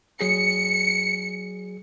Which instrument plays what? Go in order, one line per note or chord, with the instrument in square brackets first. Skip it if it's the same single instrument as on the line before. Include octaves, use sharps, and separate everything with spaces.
[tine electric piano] F#3 G#4 [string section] C#7